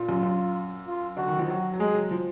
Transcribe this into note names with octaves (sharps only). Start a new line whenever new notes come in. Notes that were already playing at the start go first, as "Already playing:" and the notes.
Already playing: A#2 F4
F#2
F#2
F4
D3 F#4
D#3
F3
F#3 F#4
F#3
G#3 G#4
F#3
F3